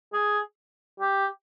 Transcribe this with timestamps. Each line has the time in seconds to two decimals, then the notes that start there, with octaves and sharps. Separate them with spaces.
0.13 G#4
1.00 G4